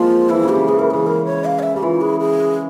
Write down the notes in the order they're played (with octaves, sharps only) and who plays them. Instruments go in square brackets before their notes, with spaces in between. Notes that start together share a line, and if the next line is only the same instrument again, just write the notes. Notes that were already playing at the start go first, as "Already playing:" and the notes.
Already playing: [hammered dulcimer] F3 G#3 A#3 C4 [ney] F4
[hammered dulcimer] E3 [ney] E4
[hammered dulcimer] C#3
[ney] G4
[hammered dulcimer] C#3
[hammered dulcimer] E3 [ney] G#4
[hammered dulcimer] E3 [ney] A#4
[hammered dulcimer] C#3 [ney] G#4
[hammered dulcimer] C#3 [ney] A#4
[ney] C#5
F5
C#5
E5
[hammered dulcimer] C#3 [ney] G4
[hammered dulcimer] E3 [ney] F4
[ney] G#4
G#4